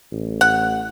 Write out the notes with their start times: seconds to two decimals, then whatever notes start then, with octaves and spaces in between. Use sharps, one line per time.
0.12 A1
0.41 F#5